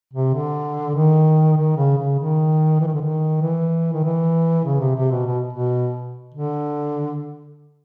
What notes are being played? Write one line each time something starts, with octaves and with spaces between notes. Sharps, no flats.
C3
D3
D#3
D#3
C#3
C#3
D#3
E3
D#3
D3
D#3
E3
D#3
E3
C#3
C3
C3
B2
B2
B2
D3